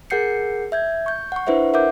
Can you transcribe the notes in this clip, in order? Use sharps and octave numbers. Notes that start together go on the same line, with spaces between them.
G#4 A#4 F#5 G6 C7 C#7
E5 G6 G#6
C#6 G6
F#5 C#6
D4 E4 B4 C5 E5 F#5
A#4 E5 F#5 D6 G6